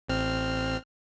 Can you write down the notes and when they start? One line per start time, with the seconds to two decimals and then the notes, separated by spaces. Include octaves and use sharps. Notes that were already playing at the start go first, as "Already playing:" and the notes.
0.08 A1 C4 F6